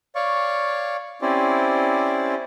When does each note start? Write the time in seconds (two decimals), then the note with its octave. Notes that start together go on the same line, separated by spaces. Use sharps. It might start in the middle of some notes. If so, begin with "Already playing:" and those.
0.15 C#5 D5 F5 C#6
1.22 C4 C#4 E4 G4 C5 D5